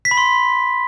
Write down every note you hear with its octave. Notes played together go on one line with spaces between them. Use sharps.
B6
B5
C6